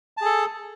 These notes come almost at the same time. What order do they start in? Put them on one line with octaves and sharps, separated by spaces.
A5 G#4 A4